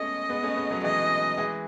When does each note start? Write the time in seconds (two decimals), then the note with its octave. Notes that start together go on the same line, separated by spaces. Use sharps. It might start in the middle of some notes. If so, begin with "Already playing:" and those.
Already playing: G#3 A3 B3 C#4 D#5
0.29 G#3 B3
0.43 A3 C#4
0.56 G#3 B3
0.71 F#3 A3
0.83 E3 G#3 D#5
1.37 E3 G#3